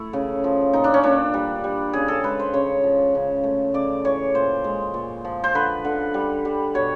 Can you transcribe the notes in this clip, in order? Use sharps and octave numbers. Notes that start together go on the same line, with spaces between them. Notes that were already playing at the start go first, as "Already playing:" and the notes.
Already playing: A3 E4
C#3
F3
A#2 D#4
D4
C#4
A#2 D4
G3
G3
C#3 G#4
A4
G#3 B4
C5
C#3 C#5
F3
C#3
A3
C#3 D5
E3 C#5
A#2 C5
G#3
A#2
F3
C5
D3 B4
D3
G3
G3
B2 C#5